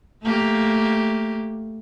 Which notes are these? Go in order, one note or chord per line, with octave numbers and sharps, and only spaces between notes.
A3 A#3 G4